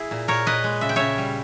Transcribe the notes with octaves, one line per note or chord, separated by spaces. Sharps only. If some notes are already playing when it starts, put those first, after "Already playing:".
Already playing: E4 G#4
A#2
A#2 A#4 C#5
A#2 B4 D#5
G#3
C#3 E5
G5
C#3 C#5 E5
G3